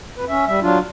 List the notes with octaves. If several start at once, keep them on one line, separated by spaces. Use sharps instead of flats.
F2 B4
C#4 E5
G3 E5
F#3 D4 F4